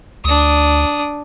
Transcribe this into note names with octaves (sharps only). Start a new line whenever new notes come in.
D2 D4 D#6